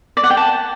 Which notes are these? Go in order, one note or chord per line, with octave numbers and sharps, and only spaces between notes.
D5
F#5
G5
A5